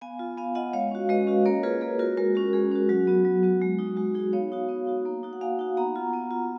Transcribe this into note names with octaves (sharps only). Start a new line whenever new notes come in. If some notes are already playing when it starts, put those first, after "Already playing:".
B3 F5 G#5
F4
B3 F5 G#5
F4 D#5 F#5
G#3 C#5 F5
C#4 F#4
G#3 B4 D#5
C#4 F#4
A#3 A#4 C#5
F4 G#4 B4
A#3 G#4
F4 F#4 A#4
G#3 F#4 A#4
C#4 F#4
G#3 G#4
C#4 F#4
F#3 F#4
B3 F#4
F#3
B3 F#4
G#3
D#4 F#4
G#3 F#4
D#4 F#4 G#4
B3 C#5 F5
D#4 F#4
B3
D#4 F#4
A#3
D#4 F#4
F#5
A#3 F5 G#5
D#4 F#4
B3 F#5 A#5
F4
B3
F4